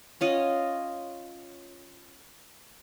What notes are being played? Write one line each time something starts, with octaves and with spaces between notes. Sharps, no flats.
C#4 F4 D#5 F#5